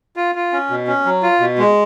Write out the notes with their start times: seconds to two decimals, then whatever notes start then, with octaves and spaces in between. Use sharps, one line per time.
0.16 F4
0.35 F4
0.53 C#4
0.70 B2
0.87 C#4
1.05 F#3
1.23 F4
1.40 B2
1.58 G#3